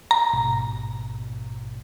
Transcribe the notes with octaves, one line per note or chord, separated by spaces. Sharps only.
A#5
A1 G#2 B2